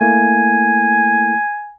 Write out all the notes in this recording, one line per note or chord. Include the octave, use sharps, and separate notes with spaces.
A3 A#3 E4 G#5